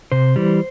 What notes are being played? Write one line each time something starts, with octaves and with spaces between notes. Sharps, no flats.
C3 C5
E3 G3